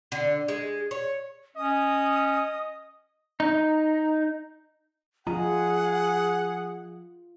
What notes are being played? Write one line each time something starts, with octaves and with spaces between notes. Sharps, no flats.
D3
G#3
C#5
C#4 D#5 D#6
D#4
F3 F4 G#4 D#5 F#5 A#5